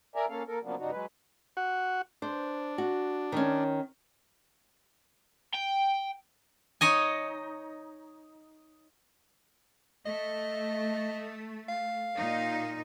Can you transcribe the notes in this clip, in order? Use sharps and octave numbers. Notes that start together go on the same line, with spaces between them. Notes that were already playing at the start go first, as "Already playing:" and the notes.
A#4 D5 E5 G#5 A#5
A#3 C#4 A4 F5
A#3 A4 A#4
C#3 F3 F#3 A#3 B3 D4
G2 C#3 D4 D#4 F#4
F#3 G#3 B4
F#4 F#5
D4 C5
F#4
D#3 C#4
G5
D#4 C#5 D#5 G#5
A3 D#5
F5
A#2 D#4